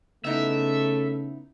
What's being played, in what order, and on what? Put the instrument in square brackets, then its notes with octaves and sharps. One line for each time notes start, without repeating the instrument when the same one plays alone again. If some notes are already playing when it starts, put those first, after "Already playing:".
[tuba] C#3 [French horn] A3 [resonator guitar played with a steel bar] B3 D#4 E4 [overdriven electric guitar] E5